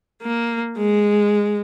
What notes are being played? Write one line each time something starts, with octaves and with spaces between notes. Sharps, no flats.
A#3
G#3